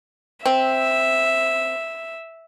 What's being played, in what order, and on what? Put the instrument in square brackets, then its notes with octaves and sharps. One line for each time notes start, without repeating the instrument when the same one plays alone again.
[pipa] C4 [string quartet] E5